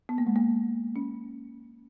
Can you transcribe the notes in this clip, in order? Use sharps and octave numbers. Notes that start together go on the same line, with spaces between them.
B3
A#3
G#3
A#3
C#4